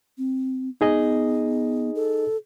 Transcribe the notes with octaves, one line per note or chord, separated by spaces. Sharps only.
C4
B3 D#4 G#4 D#5
A4